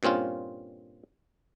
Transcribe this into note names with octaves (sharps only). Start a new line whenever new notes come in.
G2 A#2 C4 C#4 F4